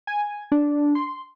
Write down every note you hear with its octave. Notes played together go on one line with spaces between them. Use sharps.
G#5
D4
C6